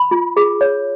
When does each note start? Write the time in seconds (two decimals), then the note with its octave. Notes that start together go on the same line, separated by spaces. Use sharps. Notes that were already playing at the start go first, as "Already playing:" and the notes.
Already playing: B5
0.11 F4
0.37 G#4
0.61 C#5